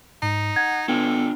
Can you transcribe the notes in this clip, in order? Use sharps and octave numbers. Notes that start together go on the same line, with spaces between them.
G#2 D#4
F#5 G#6
B3 D4 F4 A4 G5